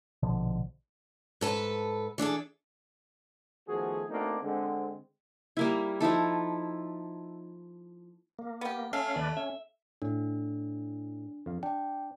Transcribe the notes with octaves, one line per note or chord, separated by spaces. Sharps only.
A#1 B2 D3 F3
G#2 A4 B4
E3 D4 G#4 A4
D#3 F3 A3 B3 F#4 G#4
A3 A#3 C4 D4 D#4 F#4
D3 G#3 C4
G3 A#3 E4
F3 D#4 E4 A4
A#3
B3 G4
A3 C#4 F5
D#2 B4 D5
C#4 E5
A2 D4
F2 F5
D4 G5